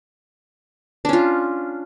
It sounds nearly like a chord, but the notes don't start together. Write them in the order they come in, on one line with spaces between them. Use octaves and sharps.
D4 C#4 F4